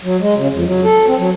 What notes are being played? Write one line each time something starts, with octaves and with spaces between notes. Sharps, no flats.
F#3
G#3
C#3
F2
F#3
A4
C4
F#3